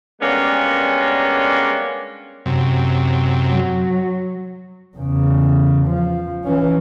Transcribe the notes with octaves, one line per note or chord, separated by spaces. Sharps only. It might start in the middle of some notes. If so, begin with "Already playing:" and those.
G3 G#3 A#3 B3 C#4 D4
F#2 C3
F#3
E2 C#3
F3
E3 C#4